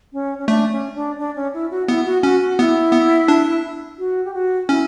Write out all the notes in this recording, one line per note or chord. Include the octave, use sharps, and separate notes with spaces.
C#4
C#4
A3 D4
C#4
D4
D4
C#4
E4
F#4
B3 E4
F#4
C#4 F#4
F#4
B3 E4
B3
D4
F#4
G4
F#4
C#4 E4